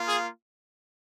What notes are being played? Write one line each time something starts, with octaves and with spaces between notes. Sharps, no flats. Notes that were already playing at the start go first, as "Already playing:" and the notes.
Already playing: A#3 F4
G#4